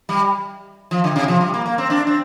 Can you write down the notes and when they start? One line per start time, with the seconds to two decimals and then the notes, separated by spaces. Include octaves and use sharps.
0.09 G3
0.91 F3
1.04 D3
1.16 C3
1.28 F3
1.41 G3
1.54 A#3
1.66 A#3
1.78 C4
1.90 D4
2.07 C4